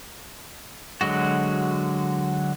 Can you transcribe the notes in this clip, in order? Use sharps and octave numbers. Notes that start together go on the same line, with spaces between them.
D3 F#3 G#3 F#4